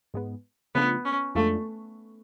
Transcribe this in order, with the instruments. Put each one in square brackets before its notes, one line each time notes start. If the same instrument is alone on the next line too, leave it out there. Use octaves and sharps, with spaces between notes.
[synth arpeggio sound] G#2 G#3 B3
[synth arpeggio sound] C#3 F3 A3 D4 F4 [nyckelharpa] B3
[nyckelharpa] C#4
[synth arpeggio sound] F2 F3 G#3 D4 F4 [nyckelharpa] A3